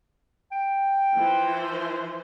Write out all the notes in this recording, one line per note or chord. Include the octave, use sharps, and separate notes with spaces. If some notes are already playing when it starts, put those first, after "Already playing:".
G5
E3 F3 C5